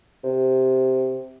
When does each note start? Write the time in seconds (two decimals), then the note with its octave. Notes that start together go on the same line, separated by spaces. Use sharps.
0.24 C3